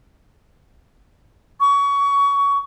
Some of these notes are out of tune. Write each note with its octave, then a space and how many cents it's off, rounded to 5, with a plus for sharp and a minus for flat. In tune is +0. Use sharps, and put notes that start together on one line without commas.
C#6 +25